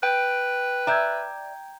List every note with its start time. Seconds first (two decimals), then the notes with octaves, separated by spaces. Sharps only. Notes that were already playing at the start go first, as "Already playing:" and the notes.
0.03 B4 G5
0.87 D5 E5 A#5 G6 G#6